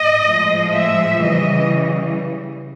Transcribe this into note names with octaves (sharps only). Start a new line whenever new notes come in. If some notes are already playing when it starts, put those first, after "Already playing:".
Already playing: D#5
A2 F3 G#3
E5
C#3 E3 G3 D#5